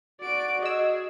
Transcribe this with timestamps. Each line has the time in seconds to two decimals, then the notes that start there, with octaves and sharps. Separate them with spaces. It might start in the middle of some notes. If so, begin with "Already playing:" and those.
0.21 F#4 D5 D7
0.62 G#4 D#5 E6